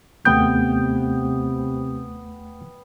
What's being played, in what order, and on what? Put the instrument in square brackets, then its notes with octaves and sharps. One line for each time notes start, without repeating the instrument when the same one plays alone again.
[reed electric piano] D#2 A3 G6 [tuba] C3 [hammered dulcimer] B3 G5